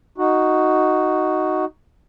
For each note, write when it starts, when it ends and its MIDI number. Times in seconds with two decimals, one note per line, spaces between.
0.18 1.65 63
0.18 1.65 66